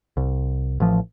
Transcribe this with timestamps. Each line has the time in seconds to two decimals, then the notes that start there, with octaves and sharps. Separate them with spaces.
0.17 C2
0.80 A1 F3